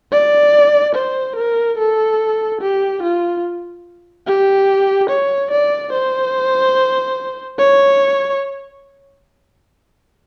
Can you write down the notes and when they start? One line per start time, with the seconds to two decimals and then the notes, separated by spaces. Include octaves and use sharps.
0.12 D5
0.95 C5
1.36 A#4
1.78 A4
2.61 G4
3.02 F4
4.27 G4
5.10 C#5
5.51 D5
5.92 C5
7.59 C#5